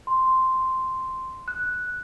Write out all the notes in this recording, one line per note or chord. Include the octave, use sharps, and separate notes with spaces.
C6
F#6